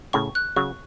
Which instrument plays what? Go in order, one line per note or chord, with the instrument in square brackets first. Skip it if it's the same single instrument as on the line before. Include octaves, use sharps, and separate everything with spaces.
[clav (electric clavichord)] A2 C#3 [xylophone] C#6
[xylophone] F#6
[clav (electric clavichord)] C#3 F#3 [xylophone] C#6